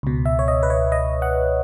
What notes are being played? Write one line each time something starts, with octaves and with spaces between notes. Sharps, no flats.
C#2 B2
E5
C#5
D#5
B4
C#5
D#5
F#5